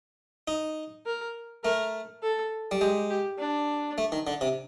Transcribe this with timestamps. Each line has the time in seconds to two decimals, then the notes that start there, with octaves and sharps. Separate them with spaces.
0.48 D#4
1.06 A#4
1.64 A3 A#4
2.23 A4
2.71 G3
2.81 G#3 G4
3.10 G4
3.39 D4
3.98 A3
4.12 D#3
4.27 D3
4.41 C3